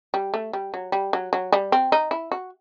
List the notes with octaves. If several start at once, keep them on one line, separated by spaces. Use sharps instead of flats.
G3
A3
G3
F#3
G3
F#3
F#3
G3
C4
D#4
E4
F#4